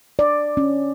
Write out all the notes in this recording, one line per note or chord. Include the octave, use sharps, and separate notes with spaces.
D5
C#4